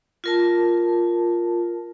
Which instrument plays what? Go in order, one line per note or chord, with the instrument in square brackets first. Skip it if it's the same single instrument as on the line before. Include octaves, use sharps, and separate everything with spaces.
[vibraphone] F4 A#4 A5